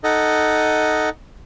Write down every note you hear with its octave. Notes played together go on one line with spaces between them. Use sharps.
D#4 A4 D#5 F#5